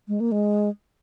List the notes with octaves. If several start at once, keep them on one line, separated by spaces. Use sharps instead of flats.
G#3
A#3
G#3